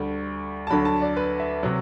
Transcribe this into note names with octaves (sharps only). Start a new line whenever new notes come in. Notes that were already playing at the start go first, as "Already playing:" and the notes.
Already playing: D2 D3 G3
A5
D2 D3 F#3 B5
A5
D5
B4
E5
C3 F#3